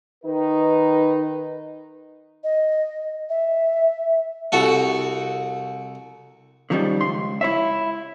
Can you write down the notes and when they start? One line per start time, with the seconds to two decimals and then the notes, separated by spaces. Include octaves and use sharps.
0.25 D#3 D#4 B4
2.44 D#5
3.29 E5
4.52 C2 F#4 A4
6.70 D3 D#3 F3 G3 C#4 D#4
7.00 C#2 C6
7.41 E4 C#5 E5